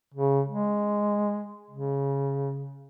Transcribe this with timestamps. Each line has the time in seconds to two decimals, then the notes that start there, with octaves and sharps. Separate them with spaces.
0.14 C#3
0.48 G#3
1.71 C#3